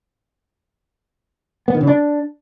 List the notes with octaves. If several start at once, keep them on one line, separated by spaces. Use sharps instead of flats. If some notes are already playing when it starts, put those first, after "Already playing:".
B3
D#3
C#3
D4